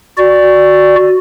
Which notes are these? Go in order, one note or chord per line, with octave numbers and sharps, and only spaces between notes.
F#4 D5